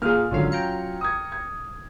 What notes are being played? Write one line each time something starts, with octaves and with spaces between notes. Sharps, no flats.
A#2 A#3 G#4 F6
G#1 D3 F#3 C#4 F4 F5
G5 A#5 C#7
D#6 G#6
G#6